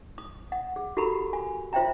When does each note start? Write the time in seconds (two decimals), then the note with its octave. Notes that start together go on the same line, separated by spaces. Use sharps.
0.18 D#6
0.52 F#5
0.76 G#4
0.97 F#4 G4 A4 A#4 A#5 B5
1.33 G#5
1.73 F4 C5 E5 G5 A#5